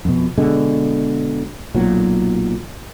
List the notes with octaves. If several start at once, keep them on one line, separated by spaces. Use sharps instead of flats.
F2 B2
B2 D3 G#3
B1 A#2 F#3